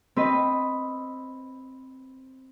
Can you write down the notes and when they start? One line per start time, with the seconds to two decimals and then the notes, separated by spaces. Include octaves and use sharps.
0.16 C4 B4 D#5